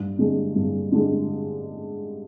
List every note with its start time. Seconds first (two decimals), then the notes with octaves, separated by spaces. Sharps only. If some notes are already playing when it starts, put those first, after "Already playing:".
Already playing: G2
0.19 D3 G#3
0.56 G2
0.92 D3 G#3